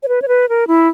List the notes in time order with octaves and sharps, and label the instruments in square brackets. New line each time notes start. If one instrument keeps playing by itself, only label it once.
[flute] C#5
B4
C#5
B4
A#4
E4